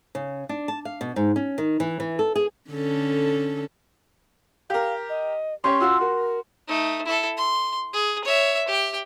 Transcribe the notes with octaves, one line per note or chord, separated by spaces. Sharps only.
C#3
D4
A5
F5
B2
G#2
C#4
D#3
E3
E3
A4
G#4
D3 C#4 A4
G4 A#4 F5
D#5
C#4 G4 C#5 C6 C#6
F4 F#4 E6
F#4 A#4
A3 D#4
E4 A4
C6
G#4
C#5 E5
G4 G5